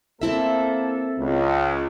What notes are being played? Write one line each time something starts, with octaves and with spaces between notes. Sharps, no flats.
A#3 C4 E4 A4 E5
C#2